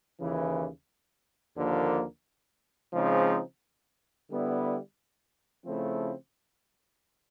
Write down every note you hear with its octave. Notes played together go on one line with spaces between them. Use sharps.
D#2 C#3 E3
D#2 D3 F3 A#3
C#3 F3 G#3 C4 D#4
D3 G3 B3 E4
C#3 F3 A3 C4 E4